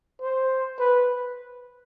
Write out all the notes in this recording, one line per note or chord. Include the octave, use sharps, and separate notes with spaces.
C5
B4